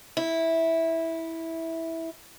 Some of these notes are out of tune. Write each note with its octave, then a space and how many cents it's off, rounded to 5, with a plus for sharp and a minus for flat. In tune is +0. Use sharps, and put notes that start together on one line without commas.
E4 -10